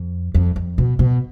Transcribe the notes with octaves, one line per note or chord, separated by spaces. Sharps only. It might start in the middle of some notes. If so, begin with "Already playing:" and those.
Already playing: F2
F2
F2
B2
B2